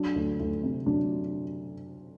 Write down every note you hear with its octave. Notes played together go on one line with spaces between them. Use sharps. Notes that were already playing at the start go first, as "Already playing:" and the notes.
Already playing: F#3 D4
D2
D2
C3
F#3 D4